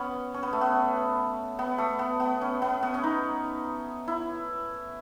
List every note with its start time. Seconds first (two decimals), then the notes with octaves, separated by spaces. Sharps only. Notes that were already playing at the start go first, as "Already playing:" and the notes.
Already playing: B3 C#4
0.34 C#4
0.43 B3
0.53 A3
0.61 B3
1.59 B3
1.78 A3
1.99 B3
2.20 B3
2.41 C#4
2.62 B3
2.83 B3
2.94 C#4
3.03 D#4
4.08 E4